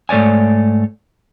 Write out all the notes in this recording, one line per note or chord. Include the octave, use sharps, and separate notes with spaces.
G#2 A3 C#5 D5 G#5